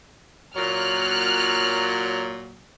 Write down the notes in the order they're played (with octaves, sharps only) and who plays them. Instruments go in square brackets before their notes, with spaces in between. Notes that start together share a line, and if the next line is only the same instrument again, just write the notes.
[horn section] A#2 F#3 [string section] F6 F#6